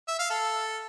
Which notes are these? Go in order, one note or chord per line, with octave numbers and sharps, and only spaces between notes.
E5
F5
A4